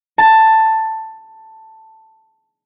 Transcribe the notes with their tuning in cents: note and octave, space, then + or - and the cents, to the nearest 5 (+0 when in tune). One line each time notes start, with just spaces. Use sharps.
A5 +10